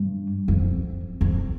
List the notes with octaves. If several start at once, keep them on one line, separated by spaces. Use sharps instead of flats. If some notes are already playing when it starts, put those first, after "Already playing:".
Already playing: G2
F2
F2